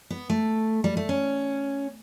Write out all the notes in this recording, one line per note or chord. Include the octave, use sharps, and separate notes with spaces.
B3
A3
G3
A3
C#4